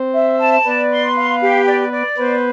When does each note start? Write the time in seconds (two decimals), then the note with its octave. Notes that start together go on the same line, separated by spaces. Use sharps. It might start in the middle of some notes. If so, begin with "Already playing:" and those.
Already playing: C4 C5
0.13 E5
0.39 A5
0.65 B3 B4 D5
0.91 C6
1.16 F5
1.41 G4
1.66 D5
1.92 D5
2.17 B3 B4 C5